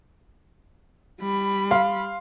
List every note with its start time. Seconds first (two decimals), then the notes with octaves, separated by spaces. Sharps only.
1.20 G3 B5
1.71 F5 C6